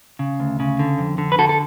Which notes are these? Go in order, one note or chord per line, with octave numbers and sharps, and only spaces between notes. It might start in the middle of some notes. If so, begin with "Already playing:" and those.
C#3
D2
C#3
D3
F2
D3
B4
D3 F#4 A4
A4